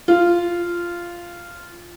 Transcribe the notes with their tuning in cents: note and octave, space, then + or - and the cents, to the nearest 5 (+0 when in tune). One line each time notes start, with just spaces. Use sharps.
F4 -10